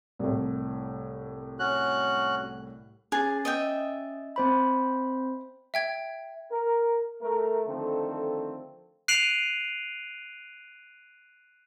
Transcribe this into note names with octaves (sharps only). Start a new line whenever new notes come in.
C2 A2
C#4 F#4 F#6
C#4 G#4 A6
D#5 E5 G5
C4 C5 B5
E5 G5 G#6
A#4
A3 A#4
D3 D#3 F3 A3 C4 A4
F#6 C7 D7 D#7 F7 F#7